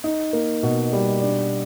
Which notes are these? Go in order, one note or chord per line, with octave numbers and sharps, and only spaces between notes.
D#4
A#3
B2
G3
D4